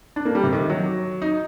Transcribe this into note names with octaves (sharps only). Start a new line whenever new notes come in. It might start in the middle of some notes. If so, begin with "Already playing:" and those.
D4
A#3
G3
C3
D#3
F#3
D#4